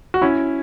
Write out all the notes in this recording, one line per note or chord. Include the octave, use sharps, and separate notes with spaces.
F#4
C#4 E4